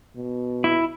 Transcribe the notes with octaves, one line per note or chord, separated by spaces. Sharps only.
B2
E4